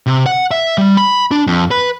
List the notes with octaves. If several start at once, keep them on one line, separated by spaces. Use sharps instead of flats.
C3
F#5
E5
G3
B5
D4
F2
B4